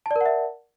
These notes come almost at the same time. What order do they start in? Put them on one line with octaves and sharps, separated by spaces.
A5 D5 A#4 F#5 E5